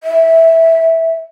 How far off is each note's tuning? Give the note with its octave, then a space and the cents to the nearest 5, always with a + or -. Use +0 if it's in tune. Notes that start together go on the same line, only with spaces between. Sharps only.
E5 -10